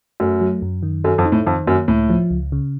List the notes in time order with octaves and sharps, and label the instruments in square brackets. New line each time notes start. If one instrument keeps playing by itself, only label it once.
[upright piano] F#2 [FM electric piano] A3
[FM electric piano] F#3
F#2
D#3
[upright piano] F#2 [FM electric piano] A4
[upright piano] F2
[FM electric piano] D#4
[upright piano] A2
[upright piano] F2 [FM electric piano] D#3
[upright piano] F#2 [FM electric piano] A#3
[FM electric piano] C#2 [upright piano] A2
[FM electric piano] F3
C#2
C#3